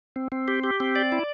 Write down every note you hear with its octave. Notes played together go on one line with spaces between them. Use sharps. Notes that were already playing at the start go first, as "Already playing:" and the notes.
C4
C4
G4
G4
C4
D5
E4